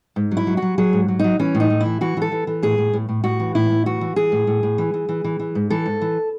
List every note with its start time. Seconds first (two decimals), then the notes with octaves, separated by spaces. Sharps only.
0.16 G#2
0.31 F#3
0.37 E4
0.47 F#3
0.57 F#4
0.62 F#3
0.78 F#3 G#4
0.93 G#2
1.08 F#3
1.19 F#3 D#4
1.39 E3 C#4
1.55 A2
1.60 D#4
1.70 A2
1.80 E3 E4
2.01 E3 F#4
2.17 E3 A4
2.32 E3
2.47 E3
2.62 A2 G#4
2.78 A2
2.93 A2
3.09 A2
3.24 A2 F#4
3.40 E3
3.55 A2 E4
3.70 A2
3.86 E3 F#4
4.01 E3
4.16 E3 G#4
4.32 A2
4.47 A2
4.63 A2
4.78 E3
4.94 E3
5.09 E3
5.24 E3
5.40 E3
5.55 G#2
5.70 E3 A4
5.86 G#2
6.02 E3